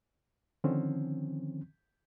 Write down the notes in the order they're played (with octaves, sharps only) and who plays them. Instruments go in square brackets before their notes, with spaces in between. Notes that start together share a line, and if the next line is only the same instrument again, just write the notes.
[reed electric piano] D3 D#3 F3 C4 C#4